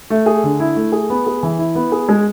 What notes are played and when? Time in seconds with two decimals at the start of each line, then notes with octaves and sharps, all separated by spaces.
0.10 A3
0.26 G#4
0.44 D3
0.60 E4
0.76 A3
0.92 G#4
1.10 B3
1.26 G#4
1.43 E3
1.59 E4
1.75 B3
1.92 G#4
2.09 G#3